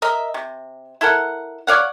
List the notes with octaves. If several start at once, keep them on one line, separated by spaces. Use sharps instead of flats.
A#4 D#5 E5
C3
E4 A4 A#4 F#5
C#5 D5 F5 F#5